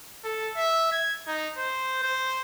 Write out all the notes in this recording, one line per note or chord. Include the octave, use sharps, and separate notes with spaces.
A4
E5
G#6
D#4
C5
C5